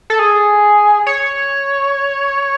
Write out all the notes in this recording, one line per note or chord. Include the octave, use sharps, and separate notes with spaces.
A4
G#4
C#5